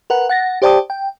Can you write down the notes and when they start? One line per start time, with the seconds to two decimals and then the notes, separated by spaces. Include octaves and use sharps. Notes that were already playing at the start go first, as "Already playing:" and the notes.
0.10 A#4 B4 F#5
0.29 F#5 A6 A#6
0.62 G4 C5 D5 G5 A5 D#6
0.90 G5